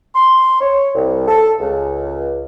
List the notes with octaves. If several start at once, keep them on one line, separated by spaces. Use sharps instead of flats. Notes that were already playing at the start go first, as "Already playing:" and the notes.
C6
C#5
C2
A4
C#2